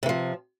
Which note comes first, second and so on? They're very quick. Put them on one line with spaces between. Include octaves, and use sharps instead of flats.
C3 E3 F3